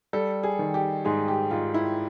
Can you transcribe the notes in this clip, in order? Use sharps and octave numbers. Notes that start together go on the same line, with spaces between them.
G3 A4
G#4
D#3
G4
G#2 G#4
G4
G#2 F4
E4